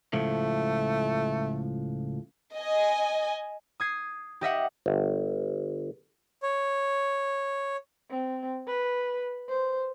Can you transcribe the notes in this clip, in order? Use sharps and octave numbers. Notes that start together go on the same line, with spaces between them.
C#2 A2 F3 A3
D#5 G#5
D#6 G#6 C7
G4 D#5 E5 F#5
G1
C#5
C4
B4
C5